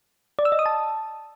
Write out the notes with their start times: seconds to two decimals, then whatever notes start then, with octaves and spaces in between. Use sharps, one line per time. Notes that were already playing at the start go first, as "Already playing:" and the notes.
0.39 D5
0.45 E6
0.52 D#5
0.59 D#6
0.66 A5